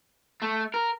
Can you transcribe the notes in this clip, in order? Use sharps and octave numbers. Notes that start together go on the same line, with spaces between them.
A3
A#4